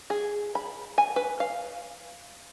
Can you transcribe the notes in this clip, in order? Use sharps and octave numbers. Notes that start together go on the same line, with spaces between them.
G#4
B5
G#5
B4
F5